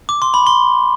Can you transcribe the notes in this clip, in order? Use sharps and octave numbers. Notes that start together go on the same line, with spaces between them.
D6
C6
B5
C6